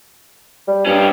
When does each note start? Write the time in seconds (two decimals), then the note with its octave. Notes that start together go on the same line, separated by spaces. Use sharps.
0.68 G3
0.86 G2 C#4 G4